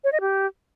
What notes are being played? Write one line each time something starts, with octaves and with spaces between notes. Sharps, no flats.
C#5
D#5
G4